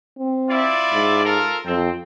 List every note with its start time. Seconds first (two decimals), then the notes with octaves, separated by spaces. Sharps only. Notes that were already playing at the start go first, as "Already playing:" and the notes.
0.18 C4
0.50 E4 F4 D5
0.93 G#2
1.25 F4 A4 A#4
1.66 F2 C4